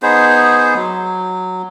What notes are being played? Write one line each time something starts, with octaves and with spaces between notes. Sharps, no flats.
B3 D#4 G#4 C5
F#3